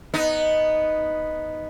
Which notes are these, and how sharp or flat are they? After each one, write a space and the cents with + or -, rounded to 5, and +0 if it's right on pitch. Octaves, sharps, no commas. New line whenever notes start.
B3 +0 D#4 +0